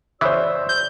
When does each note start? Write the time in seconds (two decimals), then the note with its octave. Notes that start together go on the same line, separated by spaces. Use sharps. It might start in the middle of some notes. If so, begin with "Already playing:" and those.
0.21 C#3 E3 F#4 C5 D5 E5 E6
0.69 G6